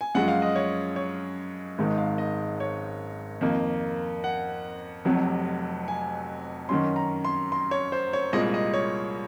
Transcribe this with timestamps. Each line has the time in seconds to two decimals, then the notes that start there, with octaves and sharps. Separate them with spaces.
0.01 G#5
0.15 F#2 F3 G#3 F#5
0.28 F5
0.42 D#5
0.56 C#5
0.96 C#5
1.78 G#1 G#2 D#3 G#3 D#4
1.98 F5
2.18 D#5
2.60 C#5
3.41 F2 D#3 A#3
4.24 F#5
5.05 F1 F2 C3 F#3
5.88 G#5
6.69 F#2 D#3 F#3 C#4 C6
6.96 A#5
7.25 C6
7.52 C6
7.71 C#5
7.92 C5
8.13 C#5
8.33 C2 A#2 G#3 D#5
8.54 D#5
8.74 C#5